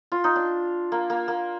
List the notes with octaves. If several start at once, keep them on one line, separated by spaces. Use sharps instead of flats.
F4
D#4
D4
A#3
A#3
A#3